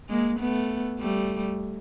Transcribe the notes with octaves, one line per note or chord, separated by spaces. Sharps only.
G#3 A#3
A3 B3
G3 A3